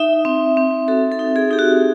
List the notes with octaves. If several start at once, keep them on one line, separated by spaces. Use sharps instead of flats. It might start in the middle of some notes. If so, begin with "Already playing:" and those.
Already playing: D#4 E5
C4
C4
F#4 A4
A4
D#4
G#4
D#4 G4
F#4